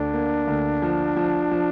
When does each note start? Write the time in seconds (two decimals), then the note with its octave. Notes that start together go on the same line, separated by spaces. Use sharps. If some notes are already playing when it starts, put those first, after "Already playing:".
Already playing: D2 D4
0.13 A#3
0.47 D2
0.82 F3
1.16 F3
1.51 F3